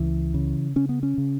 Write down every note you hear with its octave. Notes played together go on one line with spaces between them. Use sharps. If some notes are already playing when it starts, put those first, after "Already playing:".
Already playing: C#2 E3
C#3
C#3 C#4
B3
C#4
C#3